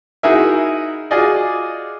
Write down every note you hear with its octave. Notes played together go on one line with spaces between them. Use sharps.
D#4 E4 F#4 G#4 A#4 E5
F4 F#4 G#4 D5 D#5